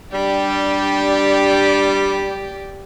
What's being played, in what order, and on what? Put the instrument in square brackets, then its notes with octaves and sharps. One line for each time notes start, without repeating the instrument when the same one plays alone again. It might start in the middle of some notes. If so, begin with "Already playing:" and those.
[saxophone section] G3 [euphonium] D4 [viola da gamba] G4 D5